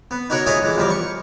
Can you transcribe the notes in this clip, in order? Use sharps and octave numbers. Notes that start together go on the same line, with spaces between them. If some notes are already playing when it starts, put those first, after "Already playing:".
B3
D#4 F#4 A#4 C#5 F#5
A3 E4 F4 G#4 C#5 D#5
E3 G#3
E2 F3 G3 A#4
C#6